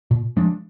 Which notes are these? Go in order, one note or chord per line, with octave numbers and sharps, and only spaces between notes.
A#2
F3 G#3 D4